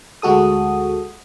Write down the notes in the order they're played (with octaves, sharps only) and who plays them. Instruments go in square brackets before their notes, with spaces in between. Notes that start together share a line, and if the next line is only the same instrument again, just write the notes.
[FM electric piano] D2 G#3 F#4 A4 D#6